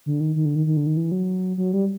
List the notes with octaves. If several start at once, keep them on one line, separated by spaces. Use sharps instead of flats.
D3
D#3
D#3
D3
D#3
D#3
D3
D#3
E3
F#3
F#3
G3